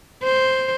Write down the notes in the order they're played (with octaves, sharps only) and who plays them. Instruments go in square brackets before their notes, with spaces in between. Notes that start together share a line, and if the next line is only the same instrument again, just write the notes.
[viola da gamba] C5